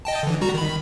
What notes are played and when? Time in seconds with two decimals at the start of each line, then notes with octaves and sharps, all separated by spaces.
0.05 D#5 G5 A5
0.23 D3 E3
0.41 G3 F#4 A#5
0.54 D#3 B5